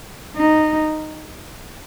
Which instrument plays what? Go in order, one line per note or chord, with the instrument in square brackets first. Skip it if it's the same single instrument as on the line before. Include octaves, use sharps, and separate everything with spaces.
[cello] D#4